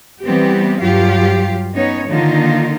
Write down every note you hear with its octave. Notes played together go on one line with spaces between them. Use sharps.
E3 G3 B3 C4 G4
G2 F#3 F4 G4 F5
B3 C#4 D#4 C#5
D3 D#3 A#3 D#4 F4